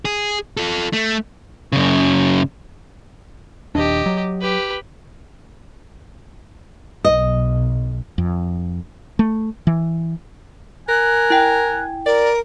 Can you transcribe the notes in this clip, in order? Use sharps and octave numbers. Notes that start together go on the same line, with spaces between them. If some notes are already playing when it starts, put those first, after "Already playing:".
G#4
F4 A4
A3
F#2 C#3
D#1 D#2 D4 G4 D#5
F#3
G4 B4
B1 D#5
F2
A3
E3
A#4 G#5 F#6
E4 G5
A#4 D5